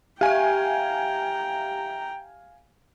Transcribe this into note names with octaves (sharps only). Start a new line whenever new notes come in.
G4 E5 F5 G5 G#5 A#5